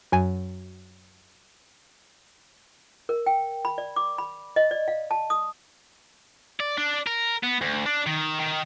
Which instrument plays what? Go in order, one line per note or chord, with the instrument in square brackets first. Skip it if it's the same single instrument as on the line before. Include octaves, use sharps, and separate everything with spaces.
[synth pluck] F#2 G#5
[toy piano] A#4
G5
B5
D5
D6
B5
D#5
D5
F5
A5
D#6
[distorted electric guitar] D5
D4
A#4
B3
D2
D4
D#3
D#3